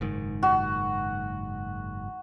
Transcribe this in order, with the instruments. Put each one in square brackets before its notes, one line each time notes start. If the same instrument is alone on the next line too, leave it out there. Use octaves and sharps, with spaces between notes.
[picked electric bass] F#1 G#2 D#3
[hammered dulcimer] F#4